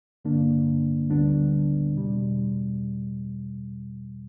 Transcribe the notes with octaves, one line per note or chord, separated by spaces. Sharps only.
G2 D3 A#3 D4
D2 D3 G3 B3 D4
E2 B2 G3